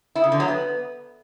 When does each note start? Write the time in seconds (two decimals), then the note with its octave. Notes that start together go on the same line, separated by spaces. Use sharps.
0.15 E4
0.24 C#3
0.32 D3
0.40 F#3
0.48 B3